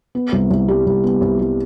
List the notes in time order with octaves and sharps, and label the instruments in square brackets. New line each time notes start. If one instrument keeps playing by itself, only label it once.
[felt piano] B3
C2
C2
G3
C2
B3
C2
G3